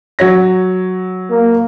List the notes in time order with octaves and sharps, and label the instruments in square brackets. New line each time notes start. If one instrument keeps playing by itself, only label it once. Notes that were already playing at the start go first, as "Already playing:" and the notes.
[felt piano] F#3 C#5 A#6
[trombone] A#3